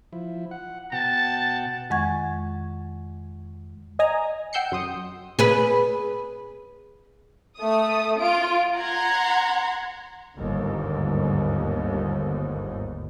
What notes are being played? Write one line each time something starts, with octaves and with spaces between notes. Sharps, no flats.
F3 E4
F#5
B2 F#5 G5 A5
F2 D#3 G#3 F#5 C#6 G#6
D#5 G#5 A#5
F#5 G5 E6 G6 C7 C#7
F#2 C6 D#6
G#4 B4
A3 D#6
F4 D7
F#5 A#5 C6 G#6
G1 D#2 G#2